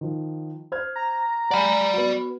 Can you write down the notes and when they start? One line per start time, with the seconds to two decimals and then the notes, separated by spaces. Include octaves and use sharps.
0.01 D#3 F3
0.72 C5 F6 G#6
0.96 A#5
1.51 D5 F#5 G#5 B5
1.93 B3 F#4